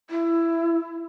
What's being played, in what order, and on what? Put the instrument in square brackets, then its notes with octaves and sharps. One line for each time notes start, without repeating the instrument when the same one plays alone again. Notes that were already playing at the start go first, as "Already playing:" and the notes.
[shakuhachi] E4